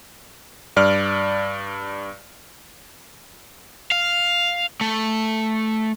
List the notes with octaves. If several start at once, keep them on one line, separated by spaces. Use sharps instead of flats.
G2 D5 F6
F5
A3